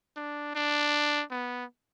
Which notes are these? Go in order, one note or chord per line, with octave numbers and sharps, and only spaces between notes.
D4
D4
B3